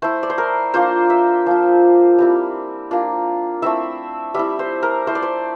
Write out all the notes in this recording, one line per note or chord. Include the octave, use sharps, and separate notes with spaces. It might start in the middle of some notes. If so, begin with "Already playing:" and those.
A3 E4 C5
D5
C5
A#4
A#3 D4 F4 C5
E5
F3 A#3 F4
G3 C4 E4
A#3 D4 F4
A3 C4 E4 E5
G3 C4 E4 E5
C5
A#4
A3 E4 C5
D5
C5